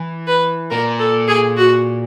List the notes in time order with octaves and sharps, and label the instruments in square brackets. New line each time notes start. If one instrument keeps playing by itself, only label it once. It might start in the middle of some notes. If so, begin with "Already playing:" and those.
Already playing: [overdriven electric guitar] E3
[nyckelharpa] B4
[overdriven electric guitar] A#2 [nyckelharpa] A#4
[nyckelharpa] A4
G#4
F#4